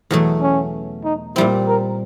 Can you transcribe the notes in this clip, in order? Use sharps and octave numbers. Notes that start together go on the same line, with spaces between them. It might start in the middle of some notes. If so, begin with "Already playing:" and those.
E2 B2 F#3 A3
C#4
D#4
A#2 G3 C4 E4
A#4